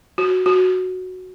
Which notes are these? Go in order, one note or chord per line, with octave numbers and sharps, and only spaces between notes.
F#4
F#4